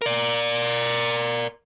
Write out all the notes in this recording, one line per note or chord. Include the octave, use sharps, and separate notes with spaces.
A#4 D5